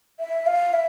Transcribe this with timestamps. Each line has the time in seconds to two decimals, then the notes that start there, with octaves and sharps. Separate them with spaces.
0.20 E5
0.47 F5
0.73 E5